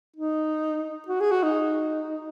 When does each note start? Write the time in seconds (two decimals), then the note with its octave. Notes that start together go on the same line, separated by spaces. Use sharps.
0.16 D#4
1.08 F#4
1.20 G#4
1.31 F#4
1.43 D#4